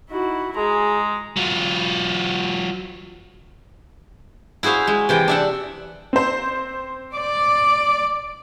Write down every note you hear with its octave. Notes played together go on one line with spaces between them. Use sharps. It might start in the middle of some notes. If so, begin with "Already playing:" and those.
D#4 E4 F#4
G#3 G#4 A#5
F#3 F4
E4 F#4 G#4 C5 F5
G#3
C3 E3 G5
D4 E5 F#5
C4 C5
D5